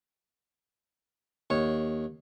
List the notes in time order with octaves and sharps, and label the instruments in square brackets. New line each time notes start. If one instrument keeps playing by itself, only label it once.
[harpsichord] D#2 C#5